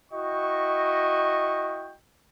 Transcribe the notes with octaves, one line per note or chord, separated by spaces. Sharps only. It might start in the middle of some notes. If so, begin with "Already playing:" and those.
E4 F#4 D#5 G5 C#6